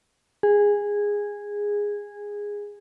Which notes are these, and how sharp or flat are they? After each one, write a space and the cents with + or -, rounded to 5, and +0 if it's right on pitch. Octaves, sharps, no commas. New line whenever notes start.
G#4 -15